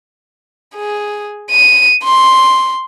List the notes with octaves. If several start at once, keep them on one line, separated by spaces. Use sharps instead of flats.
G#4
D#7
C6